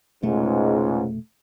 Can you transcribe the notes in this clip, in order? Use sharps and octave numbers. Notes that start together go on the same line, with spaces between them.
F1 C#2 G#2 B2 A3